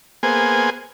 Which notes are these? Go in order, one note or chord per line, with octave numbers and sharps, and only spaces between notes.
A#3 B3 G#4 C5 G#5